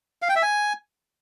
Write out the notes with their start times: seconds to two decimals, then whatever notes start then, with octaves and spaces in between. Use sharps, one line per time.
0.22 F5
0.29 G5
0.36 E5
0.43 G#5